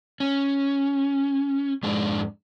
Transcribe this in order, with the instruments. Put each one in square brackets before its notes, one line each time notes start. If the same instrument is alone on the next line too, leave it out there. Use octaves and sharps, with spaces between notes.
[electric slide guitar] C#4
F2 G#2 G#3 D4